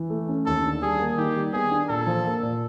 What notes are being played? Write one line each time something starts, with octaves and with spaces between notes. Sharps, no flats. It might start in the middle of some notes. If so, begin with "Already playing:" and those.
Already playing: E3
A3
C#4
D#2 A4
D3
G3 G#4
A#3
D#3 G4
G3
B3 G#4
D4
A#2 A4
F3
A#3
A#2